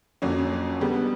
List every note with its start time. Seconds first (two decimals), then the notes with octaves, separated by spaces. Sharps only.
0.22 F2 D3 F#3 A#3 C#4
0.81 D3 G3 B3